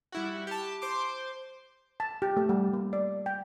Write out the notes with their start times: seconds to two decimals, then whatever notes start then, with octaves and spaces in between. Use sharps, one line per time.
0.12 G3 E4 F#4
0.47 G4 A5
0.82 C5 C6 D6
2.00 A5
2.22 G4
2.37 A3
2.49 G3
2.73 A#3
2.93 D5
3.26 G5